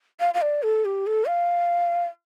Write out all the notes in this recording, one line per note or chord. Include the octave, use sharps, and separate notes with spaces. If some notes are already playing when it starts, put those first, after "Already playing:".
F5
F5
D5
A4
G4
A4
F5